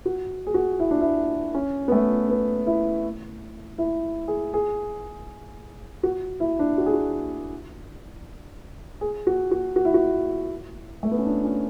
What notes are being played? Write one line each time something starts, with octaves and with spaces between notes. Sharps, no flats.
F#4
G#4
F#4
E4
D4
E4
C#4
B3
A3
B3
E4
E4
G#4
G#4
F#4
E4
D4
F#4
G#4
F#4
G#4
F#4
F#4
F#4
E4
F#4
A3
B3
C#4
D4
C#4